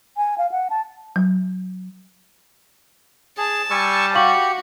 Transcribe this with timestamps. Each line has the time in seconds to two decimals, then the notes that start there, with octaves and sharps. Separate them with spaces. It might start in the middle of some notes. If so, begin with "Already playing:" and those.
0.17 G#5
0.38 F5
0.52 F#5
0.70 A5
1.16 F#3
3.37 G#4 A5
3.71 G3 G#5 C#6 E6
4.15 F#4 G4 F5 C#6 F#7